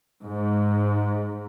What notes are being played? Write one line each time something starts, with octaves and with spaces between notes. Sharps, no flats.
G#2